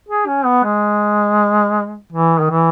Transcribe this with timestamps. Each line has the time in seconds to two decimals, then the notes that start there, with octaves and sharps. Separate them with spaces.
0.09 G#4
0.27 C#4
0.45 B3
0.64 G#3
2.13 E3
2.40 D#3
2.50 E3